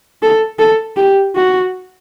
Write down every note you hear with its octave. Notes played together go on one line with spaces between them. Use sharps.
A4
A4
G4
F#4